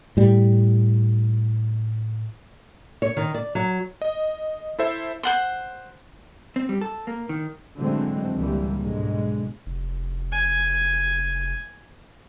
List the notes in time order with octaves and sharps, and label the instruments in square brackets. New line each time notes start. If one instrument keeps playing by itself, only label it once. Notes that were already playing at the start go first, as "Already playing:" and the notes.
[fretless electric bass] A2 G3
[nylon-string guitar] C#5
D#3
D5
F#3
[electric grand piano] D#5
E4 A4 C5 E5
[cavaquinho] C5 F#5 C6
[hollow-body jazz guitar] C4
G3
A4
A#3
D#3
[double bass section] D3 E3 F#3 G#3 A3 C4
C#2 D3 E3 G3 A#3
B1 G#2 B2 D3 G#3
[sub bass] F1
[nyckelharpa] G#5